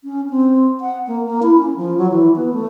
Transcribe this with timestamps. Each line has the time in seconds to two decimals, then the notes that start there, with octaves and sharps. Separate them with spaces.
0.04 C#4
0.30 C4
0.80 F#5
1.07 A#3
1.25 A#3
1.42 E4
1.57 C#4
1.76 F3
1.98 F#3
2.10 E3
2.36 B3
2.53 A3